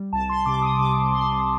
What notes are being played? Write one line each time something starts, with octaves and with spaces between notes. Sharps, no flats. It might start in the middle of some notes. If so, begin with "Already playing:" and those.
Already playing: G3
C2 A5
C6
C3 D6
D#6
C3 D6
C2 C6